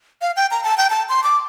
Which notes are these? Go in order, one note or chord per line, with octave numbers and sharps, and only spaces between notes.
F5
G5
A#5
A5
G5
A5
C6
D6